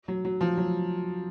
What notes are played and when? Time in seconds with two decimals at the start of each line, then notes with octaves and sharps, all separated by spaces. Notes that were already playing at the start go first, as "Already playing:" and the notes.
0.08 F#3
0.25 F#3
0.41 F3
0.58 F#3